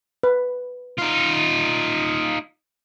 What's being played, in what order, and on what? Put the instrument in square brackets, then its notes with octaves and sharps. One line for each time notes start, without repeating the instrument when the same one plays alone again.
[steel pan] B4
[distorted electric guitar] D#4 F4